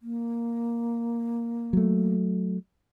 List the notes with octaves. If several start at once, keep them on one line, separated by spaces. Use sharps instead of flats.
A#3
F#3 A3